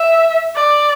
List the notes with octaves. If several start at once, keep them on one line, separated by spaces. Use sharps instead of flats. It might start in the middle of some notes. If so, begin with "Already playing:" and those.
Already playing: E5
D5